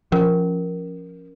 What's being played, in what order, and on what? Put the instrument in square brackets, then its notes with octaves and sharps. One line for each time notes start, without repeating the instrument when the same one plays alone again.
[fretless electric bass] F3 [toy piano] C#4 A#4